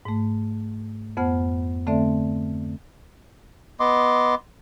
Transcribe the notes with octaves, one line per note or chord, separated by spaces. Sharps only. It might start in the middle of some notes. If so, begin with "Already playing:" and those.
G#2 A3
F2 B3 C5 F#5 F6
D3 A3 C4 A4 D5 E5
B3 D#5 C6 D6